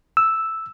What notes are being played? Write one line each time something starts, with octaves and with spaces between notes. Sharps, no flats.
E6